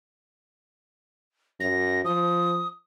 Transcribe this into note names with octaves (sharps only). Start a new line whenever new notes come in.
F#2 A#6
F3 D#6